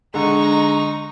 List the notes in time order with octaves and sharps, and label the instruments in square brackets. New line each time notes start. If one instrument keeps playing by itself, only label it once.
[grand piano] D3 G#3 [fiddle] D#4 C#6 [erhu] A#5